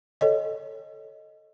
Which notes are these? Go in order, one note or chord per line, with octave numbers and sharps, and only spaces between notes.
A4 C#5 D#5